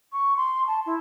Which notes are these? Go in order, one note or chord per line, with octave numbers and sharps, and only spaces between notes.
C#6
C6
A5
E4